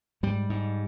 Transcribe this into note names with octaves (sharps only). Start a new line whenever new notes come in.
G#2 G3
G#2